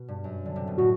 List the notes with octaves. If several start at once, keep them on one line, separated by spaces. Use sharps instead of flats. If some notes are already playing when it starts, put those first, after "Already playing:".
Already playing: B2
G2
F#2
D3
C3
B2
A2 F#4